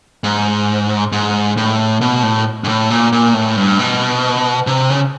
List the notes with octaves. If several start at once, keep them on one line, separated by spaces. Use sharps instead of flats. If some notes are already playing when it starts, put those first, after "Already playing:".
G#2
G#2
A2
B2
A2
G#2
A2
A#2
A#2
A2
G2
B2
C3
C#3